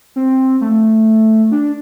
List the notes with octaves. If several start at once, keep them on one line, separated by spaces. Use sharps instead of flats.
C4
A3
D4